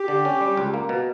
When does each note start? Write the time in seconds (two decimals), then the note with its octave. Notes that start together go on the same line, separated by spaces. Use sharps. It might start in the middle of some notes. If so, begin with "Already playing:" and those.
Already playing: G4
0.08 D3
0.25 C#4
0.41 G3
0.57 C#2
0.74 A#3
0.89 B2